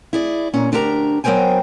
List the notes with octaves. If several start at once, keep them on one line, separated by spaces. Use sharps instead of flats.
E4 G#4 D5
A#2 C#4 A#5
D2 D4 E4 G4 A#4 A#5
F#3 B3 A#4 C5 G5 G#5